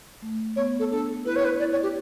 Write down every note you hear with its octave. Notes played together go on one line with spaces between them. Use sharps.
A3
B3 C#5
A4
D4 A4
E4 B4
C#5
B4
E4 D5
C#5
G4